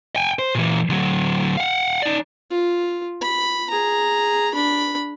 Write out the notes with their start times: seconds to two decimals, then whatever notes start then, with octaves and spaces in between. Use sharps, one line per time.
0.16 G5 G#5
0.39 C5
0.55 A#2 E3
0.89 D2 F#3
1.57 F5 F#5
2.02 D#4 D5
2.51 F4
3.21 B5
3.70 G#4 A#5
4.54 D4 B5